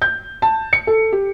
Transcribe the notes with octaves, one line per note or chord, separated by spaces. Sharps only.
G6
A5
C#7
A4
G4